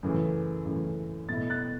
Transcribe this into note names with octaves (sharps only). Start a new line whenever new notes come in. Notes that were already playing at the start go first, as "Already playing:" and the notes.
F#2 C#3 E3 A3
F#2 C#3 E3 A3
B2 A3 E4 A6
F#6 A6